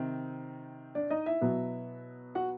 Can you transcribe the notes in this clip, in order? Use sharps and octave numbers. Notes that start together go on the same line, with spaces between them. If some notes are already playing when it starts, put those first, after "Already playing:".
Already playing: C3 D#3 C4
D4 D5
D#4 D#5
E4 E5
B2 F#3 B3
F#4 F#5